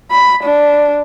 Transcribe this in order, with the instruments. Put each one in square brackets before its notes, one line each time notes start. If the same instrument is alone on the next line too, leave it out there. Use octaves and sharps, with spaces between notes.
[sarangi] B5
D4